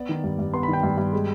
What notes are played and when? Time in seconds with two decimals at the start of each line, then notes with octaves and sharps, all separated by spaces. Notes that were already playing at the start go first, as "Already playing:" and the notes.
Already playing: B3 D5
0.09 D#3
0.24 G2
0.39 G2
0.54 B3 C6
0.63 B5
0.68 D#3
0.73 G5
0.83 G2
0.98 G2
1.13 G#3